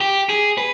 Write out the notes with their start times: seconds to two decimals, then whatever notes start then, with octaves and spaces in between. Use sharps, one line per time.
0.01 G4
0.29 G#4
0.58 B4